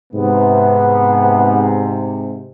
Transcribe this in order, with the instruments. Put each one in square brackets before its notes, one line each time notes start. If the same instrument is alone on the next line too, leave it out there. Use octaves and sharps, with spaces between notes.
[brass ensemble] G#2 C3 [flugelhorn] B3